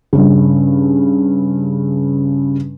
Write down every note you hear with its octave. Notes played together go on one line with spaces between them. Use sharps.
G2 C#3